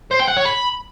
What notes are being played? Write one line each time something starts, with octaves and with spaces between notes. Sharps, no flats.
C5
G5
F#5
C#5
B5